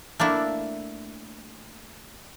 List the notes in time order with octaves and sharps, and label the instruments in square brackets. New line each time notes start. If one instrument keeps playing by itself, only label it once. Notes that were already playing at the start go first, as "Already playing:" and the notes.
[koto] A3 A#3 D4 E4